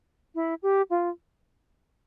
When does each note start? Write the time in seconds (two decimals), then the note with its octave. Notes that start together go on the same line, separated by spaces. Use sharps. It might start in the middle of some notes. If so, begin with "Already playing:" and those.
0.35 E4
0.63 G4
0.90 F4